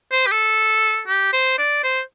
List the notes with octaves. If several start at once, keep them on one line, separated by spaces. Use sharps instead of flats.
C5
G4
A4
G4
C5
D5
C5